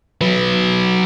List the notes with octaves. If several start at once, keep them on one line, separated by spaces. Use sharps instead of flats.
F#3 B4